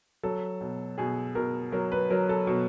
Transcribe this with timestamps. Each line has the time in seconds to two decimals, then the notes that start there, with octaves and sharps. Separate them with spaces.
0.23 F#3 A4
0.61 B2
0.98 B2 G#4
1.35 B2 A#4
1.72 F#3 A#4
1.92 B4
2.10 F#3 A#4
2.29 A4
2.47 B2